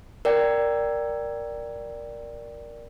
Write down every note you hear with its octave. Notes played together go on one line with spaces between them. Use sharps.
A#4 D5 G5